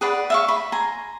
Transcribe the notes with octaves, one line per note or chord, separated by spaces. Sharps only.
G#4 B4 D5 F#5
E5 F5 C#6
B5
G#5 A#5 C6